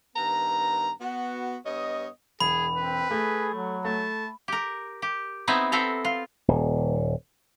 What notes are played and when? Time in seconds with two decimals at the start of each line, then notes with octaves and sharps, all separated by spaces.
0.16 G2 D#3 B3 A#5
1.01 B3 F#4
1.66 G2 B3 C#5 D#5
2.40 E1 G#4 B5
2.76 C4 B4
3.11 A3 G#4
3.54 F#3
3.85 A3 A5
4.48 G4 A#4
5.02 G4
5.47 B3 C4 D#4 E4 E5
5.72 B3 C4 A4 E5 A#5
6.05 F4
6.48 D#1